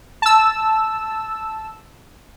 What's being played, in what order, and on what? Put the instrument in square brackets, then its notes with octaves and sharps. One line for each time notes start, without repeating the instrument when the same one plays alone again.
[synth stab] A5 E6